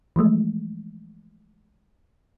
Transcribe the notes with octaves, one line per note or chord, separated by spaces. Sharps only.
E3 F3 G#3 A3